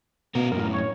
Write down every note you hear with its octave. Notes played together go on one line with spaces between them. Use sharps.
B2 B3 A#4
F#2 A2 A#4
C#5